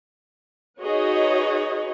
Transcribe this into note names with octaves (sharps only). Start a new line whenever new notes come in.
D#4 F#4 G#4 B4 C#5 D#5